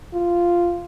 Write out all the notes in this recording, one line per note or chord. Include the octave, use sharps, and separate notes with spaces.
F4